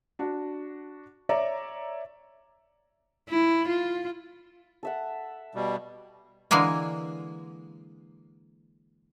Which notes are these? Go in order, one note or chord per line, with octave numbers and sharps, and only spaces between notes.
D4 F#4
C#5 D5 E5 A#5
E4
F4
A4 E5 F#5
B2 G3
D3 E3 G#3 A#3 G#5